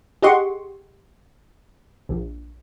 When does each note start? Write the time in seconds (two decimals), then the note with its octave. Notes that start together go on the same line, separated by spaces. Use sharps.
0.22 G4 G#4 D#5 F#5 C6 C#6
2.09 A#1